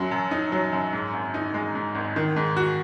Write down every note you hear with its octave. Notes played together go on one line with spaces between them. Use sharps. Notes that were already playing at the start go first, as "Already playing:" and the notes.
Already playing: F#2 F#3
F#2
D#4
F#3
F#2
G#2
G#1
D#4
G#3
G#2
G#1
D#3
G#2
F#4